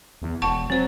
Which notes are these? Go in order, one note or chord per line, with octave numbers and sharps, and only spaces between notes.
E2
E1 F#5 A5 C#6
F#3 C4 C5